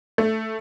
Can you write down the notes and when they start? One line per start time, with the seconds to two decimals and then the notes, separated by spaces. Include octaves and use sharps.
0.18 A3